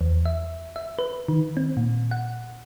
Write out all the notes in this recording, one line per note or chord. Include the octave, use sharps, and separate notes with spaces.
E2
E5
E5
B4
D#3
C4
A#2
F#5